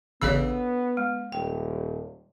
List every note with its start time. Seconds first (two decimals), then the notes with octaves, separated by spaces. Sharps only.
0.22 A1 C#3 B3 D4 A4 C#5 E6
0.97 G#3
1.32 D#1 G5